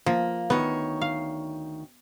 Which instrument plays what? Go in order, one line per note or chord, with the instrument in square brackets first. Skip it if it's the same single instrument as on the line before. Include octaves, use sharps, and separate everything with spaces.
[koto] F3 [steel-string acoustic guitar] A#3
[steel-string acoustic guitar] D2 D#3 C#5 [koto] B3
[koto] F5